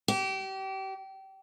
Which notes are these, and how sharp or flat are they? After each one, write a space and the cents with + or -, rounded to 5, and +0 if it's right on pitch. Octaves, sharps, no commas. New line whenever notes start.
G4 -30